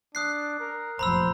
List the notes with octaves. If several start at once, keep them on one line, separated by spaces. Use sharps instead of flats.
D4 D#6 F#6 C7
A#4
F1 A#2 F3 C5 A#5 B5 E6